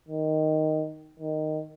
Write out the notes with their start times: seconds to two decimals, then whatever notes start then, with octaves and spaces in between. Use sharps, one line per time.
0.08 D#3
1.20 D#3